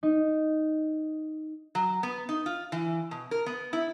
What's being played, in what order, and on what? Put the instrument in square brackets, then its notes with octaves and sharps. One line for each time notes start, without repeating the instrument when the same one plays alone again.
[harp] D#4
[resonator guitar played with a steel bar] F#3
B3
D#4
F4
E3
B2
A#4
B3
E4